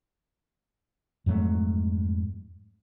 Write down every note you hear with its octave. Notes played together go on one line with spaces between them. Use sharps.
F2 G#2 F#3 A3